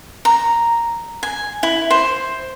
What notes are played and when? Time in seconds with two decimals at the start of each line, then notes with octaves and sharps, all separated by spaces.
0.25 A#5
1.23 G#5
1.63 E4
1.90 C5